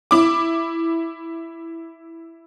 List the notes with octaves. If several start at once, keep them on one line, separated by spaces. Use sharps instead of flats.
E4 D6